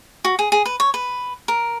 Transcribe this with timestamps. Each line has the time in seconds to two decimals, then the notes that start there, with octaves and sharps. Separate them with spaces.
0.25 F#4
0.39 G#4
0.52 G#4
0.66 B4
0.80 C#5
0.94 B4
1.48 A#4